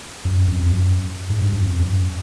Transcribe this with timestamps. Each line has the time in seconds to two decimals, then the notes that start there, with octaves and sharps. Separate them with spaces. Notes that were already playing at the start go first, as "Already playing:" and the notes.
0.25 F#2
0.48 F2
0.66 F2
0.71 F#2
1.30 G#2
1.41 G2
1.53 F#2
1.62 F2
1.80 F#2